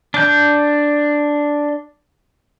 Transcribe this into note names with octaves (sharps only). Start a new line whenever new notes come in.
D4 G6